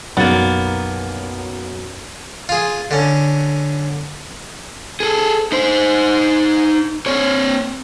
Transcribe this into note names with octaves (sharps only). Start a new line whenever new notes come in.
B1 F#2 A#3 B3 A6
F4 G#4
D3 C#4
G#4 A4
D#4 C5
C4 C#5